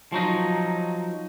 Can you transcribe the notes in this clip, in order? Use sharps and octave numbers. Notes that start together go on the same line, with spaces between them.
F3 F#3 D#4